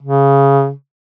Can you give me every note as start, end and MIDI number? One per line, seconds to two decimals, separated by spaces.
0.03 0.71 49